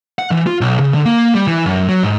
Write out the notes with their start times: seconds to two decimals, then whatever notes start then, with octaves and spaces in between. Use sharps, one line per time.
0.19 F#5
0.31 E3
0.47 F4
0.61 B1
0.80 C#3
0.94 D3
1.05 A#3
1.35 G3
1.48 E3
1.66 F#2
1.89 F#3
2.03 G#2